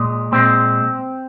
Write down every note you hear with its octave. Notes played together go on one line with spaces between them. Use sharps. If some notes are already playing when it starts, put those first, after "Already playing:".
Already playing: A#2 G#3
A#2 G#3 C4